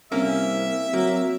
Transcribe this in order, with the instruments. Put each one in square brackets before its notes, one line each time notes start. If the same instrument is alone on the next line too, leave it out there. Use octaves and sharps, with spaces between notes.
[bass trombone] C2 [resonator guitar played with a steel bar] A#3 C#4 [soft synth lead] C4 [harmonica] E5
[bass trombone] F#3 [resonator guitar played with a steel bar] A#3